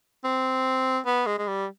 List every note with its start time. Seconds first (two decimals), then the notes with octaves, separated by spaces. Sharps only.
0.24 C4
1.06 B3
1.27 G#3
1.39 G#3
1.47 G3